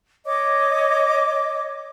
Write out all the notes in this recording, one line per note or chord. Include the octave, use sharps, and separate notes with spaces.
C#5 D#5 D6